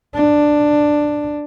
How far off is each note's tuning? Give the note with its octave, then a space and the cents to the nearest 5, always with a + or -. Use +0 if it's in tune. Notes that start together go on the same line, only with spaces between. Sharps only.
D4 +5